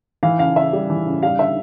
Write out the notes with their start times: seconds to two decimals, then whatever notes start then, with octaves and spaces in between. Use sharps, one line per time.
0.23 E3 F5
0.39 C#3 F5
0.56 C#3 E5
0.73 G3
0.90 E3
1.06 C#3
1.23 G3 F5
1.39 D3 E5